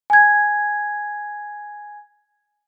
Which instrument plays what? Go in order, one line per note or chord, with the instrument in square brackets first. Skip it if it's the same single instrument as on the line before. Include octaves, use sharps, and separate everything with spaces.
[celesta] G#5 G#6